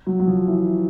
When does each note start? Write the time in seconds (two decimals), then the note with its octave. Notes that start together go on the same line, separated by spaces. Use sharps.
0.06 F#3
0.20 F#3
0.27 F3
0.47 E3